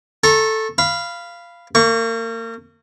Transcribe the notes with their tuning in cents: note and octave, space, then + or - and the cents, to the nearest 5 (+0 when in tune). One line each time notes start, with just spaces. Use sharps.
A4 +0 A#5 +0 C#6 -30
F5 -15 B5 +0
A#3 -35 C#6 +0